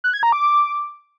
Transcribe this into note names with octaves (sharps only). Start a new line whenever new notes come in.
F#6
G#6
A#5
D6